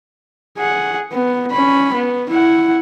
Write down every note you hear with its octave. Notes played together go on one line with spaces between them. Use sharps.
G#4 F#5
B3
C#4 B5
B3
E4 F#5